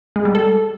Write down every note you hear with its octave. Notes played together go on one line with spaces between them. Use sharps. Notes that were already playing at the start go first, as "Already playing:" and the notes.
G#3
G3
A4